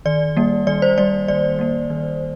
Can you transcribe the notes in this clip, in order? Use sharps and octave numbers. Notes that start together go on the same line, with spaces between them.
D#3 D5
G3 A#3
D#3 D5
C5
G3 A#3 D5
D#3 D5
G3 A#3
D#3